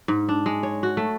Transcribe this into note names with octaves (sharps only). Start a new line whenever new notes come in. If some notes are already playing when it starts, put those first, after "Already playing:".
G#2
D4
G#3
C#5
F#4
A3